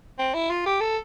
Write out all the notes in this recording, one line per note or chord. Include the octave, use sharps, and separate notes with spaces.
C4
E4
F4
G4
A4